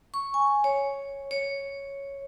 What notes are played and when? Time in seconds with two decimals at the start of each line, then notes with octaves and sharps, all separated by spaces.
0.14 C#6
0.34 G#5
0.64 C#5
1.31 C#5